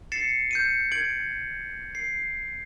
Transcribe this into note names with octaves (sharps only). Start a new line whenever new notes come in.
A6 C7 C#7 E7
G6 C#7 D#7
G#6 D7 F#7
C7